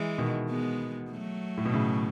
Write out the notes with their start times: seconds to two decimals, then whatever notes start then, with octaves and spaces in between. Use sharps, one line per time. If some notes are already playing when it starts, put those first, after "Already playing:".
Already playing: E3 G#3
0.18 B2 D#3
0.50 G#3 B3
1.11 F#3 A3
1.57 A2
1.65 B2
1.73 A2 C#3